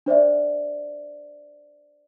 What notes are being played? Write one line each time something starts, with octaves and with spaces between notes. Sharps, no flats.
D4 C5 D5 E5